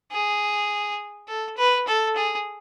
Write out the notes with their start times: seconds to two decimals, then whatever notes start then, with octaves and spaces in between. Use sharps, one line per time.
0.12 G#4
1.28 A4
1.57 B4
1.87 A4
2.16 G#4